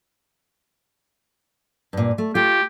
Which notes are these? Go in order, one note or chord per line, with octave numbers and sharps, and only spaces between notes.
G2 A#2
A3
A3 F4 G4